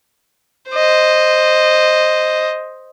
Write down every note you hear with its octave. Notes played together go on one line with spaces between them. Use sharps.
C5 D#5